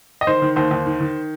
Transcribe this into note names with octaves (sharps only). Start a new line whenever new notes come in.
D#5
D#3 C5
D#3
D#2 C5
D#2
D#3
D#3